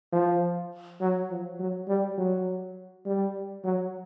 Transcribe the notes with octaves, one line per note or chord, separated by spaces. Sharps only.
F3
F#3
F3
F#3
G3
F#3
G3
F#3